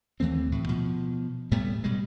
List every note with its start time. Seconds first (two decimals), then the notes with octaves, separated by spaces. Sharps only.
0.20 D#2 E3 A3 C4
0.47 D2 A2
0.69 B2 F3
1.52 A2 G3 A3 B3
1.84 B2 G3 G#3